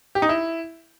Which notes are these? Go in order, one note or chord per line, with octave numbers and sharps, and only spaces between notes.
G4
D#4
E4